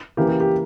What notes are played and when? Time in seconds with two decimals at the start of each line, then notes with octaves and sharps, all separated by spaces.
0.17 C#3 E3 A#3 E4 G4 B4
0.29 G4
0.40 G4